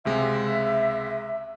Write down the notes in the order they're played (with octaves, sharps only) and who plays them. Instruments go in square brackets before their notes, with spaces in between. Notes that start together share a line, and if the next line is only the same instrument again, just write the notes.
[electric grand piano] C#2 C3 G#3 [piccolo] E5